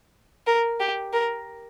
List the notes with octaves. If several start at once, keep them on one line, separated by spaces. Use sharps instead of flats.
A#4
G4
A#4